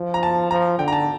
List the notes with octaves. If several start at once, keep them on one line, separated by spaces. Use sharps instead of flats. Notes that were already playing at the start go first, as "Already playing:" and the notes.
Already playing: F3
A#5
A5
F3 A#5
D3 G5
A#5
A5